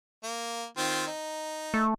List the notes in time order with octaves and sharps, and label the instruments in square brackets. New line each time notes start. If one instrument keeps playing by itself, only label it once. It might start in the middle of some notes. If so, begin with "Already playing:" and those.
[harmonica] A#3
D#3 C4 F4
D#4
[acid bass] A3